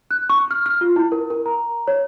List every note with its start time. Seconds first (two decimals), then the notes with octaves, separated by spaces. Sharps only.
0.11 F#6
0.30 C#6
0.51 F6
0.66 F6
0.81 F4
0.96 E4
1.12 A#4
1.30 A#4
1.46 A#5
1.88 C#5